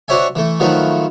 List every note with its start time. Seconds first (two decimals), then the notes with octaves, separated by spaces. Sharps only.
0.08 D4 F#4 C5 C#5 E5 G#5
0.35 E3 A3
0.60 D#3 F3 F#3 A3 B4